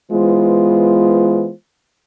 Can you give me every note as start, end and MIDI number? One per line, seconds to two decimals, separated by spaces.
0.12 1.51 52
0.12 1.51 56
0.12 1.51 59
0.12 1.51 65
0.12 1.51 72